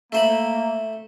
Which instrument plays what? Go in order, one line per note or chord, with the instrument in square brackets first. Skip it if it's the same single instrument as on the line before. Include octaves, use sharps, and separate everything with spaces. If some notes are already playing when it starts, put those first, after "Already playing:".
[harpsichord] A3 C5 B5 [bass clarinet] A#3